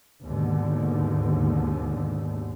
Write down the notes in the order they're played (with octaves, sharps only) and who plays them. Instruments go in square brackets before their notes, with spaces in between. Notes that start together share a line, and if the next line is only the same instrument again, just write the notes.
[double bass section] D#2 G#2 B2 D3